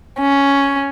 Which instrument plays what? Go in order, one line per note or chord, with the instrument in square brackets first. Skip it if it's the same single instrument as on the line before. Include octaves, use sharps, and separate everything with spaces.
[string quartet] C#4